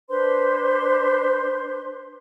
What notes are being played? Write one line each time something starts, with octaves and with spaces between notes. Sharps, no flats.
D4 B4 C5 C6